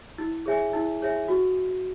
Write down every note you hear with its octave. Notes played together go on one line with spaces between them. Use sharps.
E4
G#4 C#5 E5 G#5
E4
G#4 C#5 E5 G#5
F#4